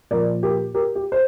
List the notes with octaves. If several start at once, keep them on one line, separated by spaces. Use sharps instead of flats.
A#2 F3 A#4 D5
G4 A#4
G4 A#4
G4
C5